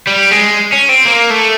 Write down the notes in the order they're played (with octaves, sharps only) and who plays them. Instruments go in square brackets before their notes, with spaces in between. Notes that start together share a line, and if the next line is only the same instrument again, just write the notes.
[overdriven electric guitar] G3
G#3
C#4
C4
A#3
A3